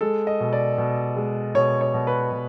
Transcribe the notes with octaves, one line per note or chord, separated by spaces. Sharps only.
G#3 A4
D#5
B2
D5
B2
G#3
B2 C#5
C#5
B2
B4
B2